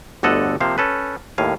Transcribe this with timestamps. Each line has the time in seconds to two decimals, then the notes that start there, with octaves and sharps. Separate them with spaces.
0.23 G1 D2 D3 A4 D#5 F#5
0.60 C3 F3 A#3 C5 F5
0.78 C#4 A4 B4
1.38 D#2 A2 F5 G#5